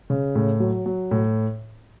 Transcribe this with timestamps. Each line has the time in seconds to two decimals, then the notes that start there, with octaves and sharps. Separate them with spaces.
0.10 C#3
0.35 A2
0.60 F#3
0.86 F#3
1.11 A2